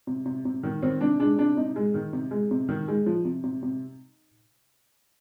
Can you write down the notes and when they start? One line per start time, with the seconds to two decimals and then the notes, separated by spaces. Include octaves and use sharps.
0.07 C3
0.26 C3
0.45 C3
0.63 D#3
0.83 D#3 C4
1.01 C3 D4
1.20 G#3 D4
1.38 C3 D4
1.57 C3 D#4
1.76 G#3
1.94 D#3
2.13 C3
2.31 G#3
2.51 C3
2.69 D#3
2.88 G#3
3.06 F3
3.25 C3
3.44 C3
3.63 C3